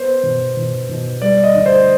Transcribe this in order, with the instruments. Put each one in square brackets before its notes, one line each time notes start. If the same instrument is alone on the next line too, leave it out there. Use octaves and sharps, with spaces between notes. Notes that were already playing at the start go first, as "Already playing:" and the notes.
Already playing: [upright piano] B3 [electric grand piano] C5
[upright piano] B2
B2
B2
[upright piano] G3 [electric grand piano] D5
[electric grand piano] D#5
[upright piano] D2
[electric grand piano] C5